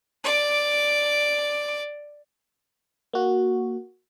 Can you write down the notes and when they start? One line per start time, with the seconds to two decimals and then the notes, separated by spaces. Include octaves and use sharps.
0.24 D5 D6
3.13 A#3 F#4